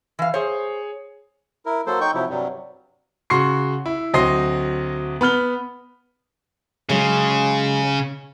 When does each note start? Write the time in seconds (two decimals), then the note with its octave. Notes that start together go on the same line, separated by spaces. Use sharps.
0.19 E3 F5
0.34 G#4 C5 C#5
1.66 E4 A#4
1.87 F#3 A#3 A4 C5
2.01 D#4 G5 C#6 G6
2.14 C3 F3 F#3 E4
2.30 G2 C3 F#3 G3
3.30 C#3 F#4 C6 C#6 C7
3.86 E4
4.14 D2 F#3 C4 D#5 C6 C7
5.21 B3 B5 F6 G7
6.89 C#3 F#3 G#3